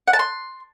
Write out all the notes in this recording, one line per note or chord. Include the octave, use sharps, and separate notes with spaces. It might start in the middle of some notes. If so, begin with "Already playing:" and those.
F#5
A5
C6